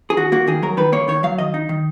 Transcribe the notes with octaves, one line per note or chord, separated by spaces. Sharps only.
G#4
D#3 F#4
A#3 F#4
D#3 G#4
F#3 A#4
D#3 B4
A#3 C#5
D#3 C#5
F#3 F5
D#3 D#5
D#4
D#3